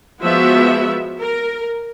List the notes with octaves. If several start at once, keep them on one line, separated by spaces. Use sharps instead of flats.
F3 G#3 B3 F#4 E5
A#4